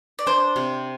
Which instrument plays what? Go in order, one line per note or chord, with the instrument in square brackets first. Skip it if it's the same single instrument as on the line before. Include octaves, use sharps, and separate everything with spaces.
[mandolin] D5
[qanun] D4 [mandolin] C5
[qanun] C3